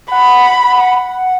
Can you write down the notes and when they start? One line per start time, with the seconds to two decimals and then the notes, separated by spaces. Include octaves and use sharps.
0.11 F#5 B5